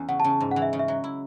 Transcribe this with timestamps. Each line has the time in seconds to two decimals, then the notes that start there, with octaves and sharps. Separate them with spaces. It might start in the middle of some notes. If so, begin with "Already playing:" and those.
Already playing: E2 E3 C#4
0.08 C#3 F#5
0.20 A5
0.24 C#3
0.30 A5
0.40 G#2
0.51 F#5
0.56 E3
0.62 E5
0.73 C#3
0.79 E5
0.88 F#3
1.04 E4